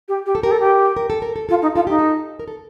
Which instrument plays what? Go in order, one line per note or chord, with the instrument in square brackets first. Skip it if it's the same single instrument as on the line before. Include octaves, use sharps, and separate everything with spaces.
[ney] G4
G4
[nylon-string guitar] A4
[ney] G4 [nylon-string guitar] A#4
[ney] A4
G4
[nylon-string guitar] A#4
A4
A#4
A4
[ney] F4 [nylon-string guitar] A4
[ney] D#4
[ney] F4 [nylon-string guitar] A4
[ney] D#4 [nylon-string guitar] G4
[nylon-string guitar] A4
A#4
A4